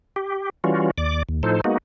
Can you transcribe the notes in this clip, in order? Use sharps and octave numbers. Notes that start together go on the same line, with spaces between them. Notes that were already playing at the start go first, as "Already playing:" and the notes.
G4
E3 G3 C#4 F4 F#4
D#2 D5 D6
D#2
A2 F3 D#4 A4 C5
G#3 A#3 B3 D#4 F#4